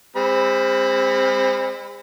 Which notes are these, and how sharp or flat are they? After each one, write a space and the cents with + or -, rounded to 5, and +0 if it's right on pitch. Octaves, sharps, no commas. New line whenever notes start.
G#3 -45 C4 +0 B5 +5